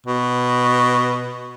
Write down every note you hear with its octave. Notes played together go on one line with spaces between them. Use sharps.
B2